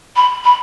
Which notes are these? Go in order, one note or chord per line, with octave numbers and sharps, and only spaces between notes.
B5
B5